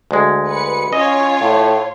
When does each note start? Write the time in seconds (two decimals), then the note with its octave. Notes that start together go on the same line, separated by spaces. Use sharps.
0.11 D2 G#3
0.48 B4 C#7
0.93 C#4 F4 C#5 D#5
1.41 A2